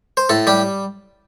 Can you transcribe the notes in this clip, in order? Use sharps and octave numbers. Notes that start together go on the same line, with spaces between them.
C5
A2 A4
G3 G4